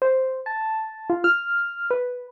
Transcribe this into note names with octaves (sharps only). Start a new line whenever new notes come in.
C5
A5
F4
F6
B4